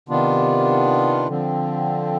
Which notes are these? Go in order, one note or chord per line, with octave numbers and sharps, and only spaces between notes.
C3 D#3 B3 D4 F4
D3 F3 C4